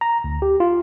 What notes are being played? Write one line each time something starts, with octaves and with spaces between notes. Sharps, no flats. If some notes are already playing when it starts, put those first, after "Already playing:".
A#5
D2
G4
F4